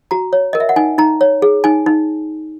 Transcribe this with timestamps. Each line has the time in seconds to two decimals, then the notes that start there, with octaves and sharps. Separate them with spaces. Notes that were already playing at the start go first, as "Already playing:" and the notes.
0.11 F#4 A#5
0.33 C#5
0.53 A#4 D#5
0.60 E5
0.69 F#5
0.76 D#4 G#5
0.98 D#4 A#5
1.21 C#5
1.42 G#4
1.64 D#4 G#5
1.86 D#4